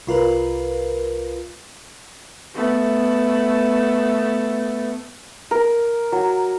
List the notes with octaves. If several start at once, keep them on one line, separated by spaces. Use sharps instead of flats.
C2 F4 A#4 B4
A3 B3
A#4
F#3